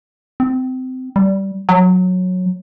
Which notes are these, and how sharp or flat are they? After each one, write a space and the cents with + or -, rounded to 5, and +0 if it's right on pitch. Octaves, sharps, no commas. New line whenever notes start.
C4 -25
G3 -15
F#3 -15